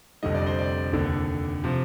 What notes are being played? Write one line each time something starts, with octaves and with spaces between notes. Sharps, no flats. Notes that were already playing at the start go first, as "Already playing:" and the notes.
F1 F2 D3 G3 D#5
D5
C5
D5
F1 D#2 D3
C3 F3